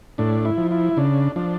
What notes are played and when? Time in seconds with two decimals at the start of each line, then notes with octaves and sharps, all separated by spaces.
0.18 A2 D4
0.45 E4
0.57 F3
0.71 E4
0.97 C#3 D4
1.36 F3 D4